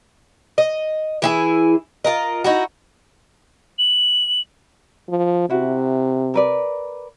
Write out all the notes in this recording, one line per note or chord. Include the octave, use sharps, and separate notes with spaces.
D#5
E3 E4 G#4
F4 A#4 D#5
D#4 E4 F#4
F#7
F3
C3 E4 F#4
A#4 B4 D5